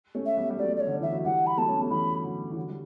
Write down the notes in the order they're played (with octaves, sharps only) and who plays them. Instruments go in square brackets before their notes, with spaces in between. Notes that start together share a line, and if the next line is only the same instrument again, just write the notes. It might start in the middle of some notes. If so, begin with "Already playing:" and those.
[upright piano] A3 C#4
[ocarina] E5
[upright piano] G3 B3
G3
[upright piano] F#3 A3 [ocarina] D5
[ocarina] D5
C#5
[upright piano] D3
[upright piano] E3 [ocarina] E5
[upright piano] F#3
[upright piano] E3 G3 [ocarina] F#5
[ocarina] B5
[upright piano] F#3 A3 [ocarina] A5
[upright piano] C#4
B3
A3
[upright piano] E3 G3 [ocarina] B5
[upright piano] D3 F#3
E3
D3 F#3
G3